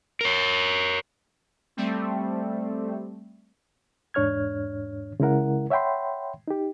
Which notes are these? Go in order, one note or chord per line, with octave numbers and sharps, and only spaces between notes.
A#4 C#5
G3 A3 C4
E2 G#2 D4 C#5 F6 G#6
C#3 G#3 E4 A#4 F#5
C#5 E5 F#5 G5 B5 C6
D#4 G4